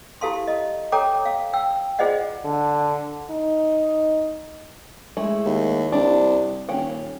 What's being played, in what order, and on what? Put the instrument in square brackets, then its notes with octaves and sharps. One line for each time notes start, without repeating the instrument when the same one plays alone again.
[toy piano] E4 G4 A4 F5 A5 C6
D#5
A4 C#5 G5 A#5 D6
F5
G5 E6
F4 G#4 C5 D5 D#5 F#5
[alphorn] D3
D#4
[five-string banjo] G#3 A3 E4
[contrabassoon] D#2
[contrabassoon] C2 [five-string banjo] D4
[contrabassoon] D#1 [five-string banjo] C#4 F#5 G5